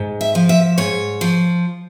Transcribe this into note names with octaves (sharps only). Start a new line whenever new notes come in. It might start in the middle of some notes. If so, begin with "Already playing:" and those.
Already playing: G#2
E5
F3
E5
G#2 C#5
F3